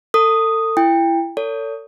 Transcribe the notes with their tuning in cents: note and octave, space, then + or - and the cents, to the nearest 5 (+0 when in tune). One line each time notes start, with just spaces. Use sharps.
A4 +30 D#6 -5
E4 +20 G5 +25
A4 +35 C#5 +40